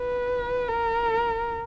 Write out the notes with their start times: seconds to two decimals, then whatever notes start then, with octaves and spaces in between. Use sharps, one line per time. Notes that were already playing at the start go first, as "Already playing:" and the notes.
Already playing: B4
0.68 A#4